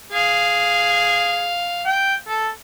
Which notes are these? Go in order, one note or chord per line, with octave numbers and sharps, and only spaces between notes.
G#4 F5
G5
A4